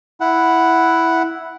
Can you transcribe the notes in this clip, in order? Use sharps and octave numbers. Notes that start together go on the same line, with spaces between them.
E4 F#5